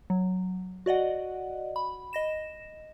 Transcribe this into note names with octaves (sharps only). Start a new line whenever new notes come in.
F#3
F#4 D5 D#5 F#5
B5
D#5 A#6 E7